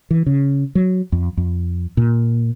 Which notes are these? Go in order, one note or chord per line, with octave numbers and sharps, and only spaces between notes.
E3
C#3
F#3
F2
F2
A#2